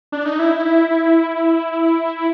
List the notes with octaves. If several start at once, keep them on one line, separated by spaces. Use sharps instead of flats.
D4
D#4
E4